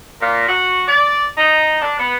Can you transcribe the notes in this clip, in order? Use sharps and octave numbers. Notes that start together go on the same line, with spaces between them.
A#2
F#4
D5
D#4
D4
B3